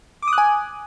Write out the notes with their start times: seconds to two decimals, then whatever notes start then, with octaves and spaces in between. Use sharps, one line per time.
0.22 D6
0.28 D#6
0.33 F#6
0.38 G#5